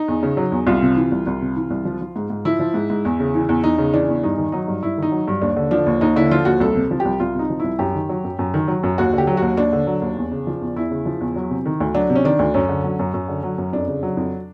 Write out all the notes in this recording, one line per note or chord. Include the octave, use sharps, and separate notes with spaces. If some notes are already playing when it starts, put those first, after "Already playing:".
Already playing: D#4
E2
C#3
F#3
E2
C2 F4
C3
E3
C2
C2
C3
E3
C2
F3
F3
G#2
G#2
F3 E4
F3
G#2
G#2
E2
C#3
E3
E2
E2 D#4
C#3
E3 D4
E2
G2 D#4
D#3
F#3 D#4
G2
G2 E4
D#3 D#4
F#3
G2
D#2 D4
D3
F3 D4
D#2
D#2 D#4
D3 E4
F3 F4
D#2 F#4
C2 A4
C3
F3
G4
C2
C2 F4
C3 D#4
F3
C2 E4
F#2 G4
D#3
F#3
F#2
F#2
D#3
F#3
F#2
D#2 F#4
D3 G4
F#3
D#2 F#4
D#2 D4
D3
F#3
D#2
E2
C#3
F3
E2
E2 E4
C#3
F3
E2
F#3
C3
D#3
D2
F#3 D4
C3
C#4
D#3 D4
D2
F#2 C#4
D3
F#3
F#2
F#2
D3
F#3
F#2
F2 D4
C#3
F#3
F2